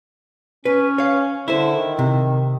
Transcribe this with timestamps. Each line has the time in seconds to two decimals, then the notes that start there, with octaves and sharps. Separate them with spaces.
0.65 C#4 B4
0.98 C#5 F5
1.48 D3 E4 C5
1.75 D#3
1.99 C3